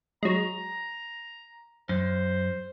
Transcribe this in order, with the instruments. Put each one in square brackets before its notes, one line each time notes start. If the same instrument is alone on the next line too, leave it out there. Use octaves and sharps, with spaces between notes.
[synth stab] F#3 G#3 [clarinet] A#5
[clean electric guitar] F#2 [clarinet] C5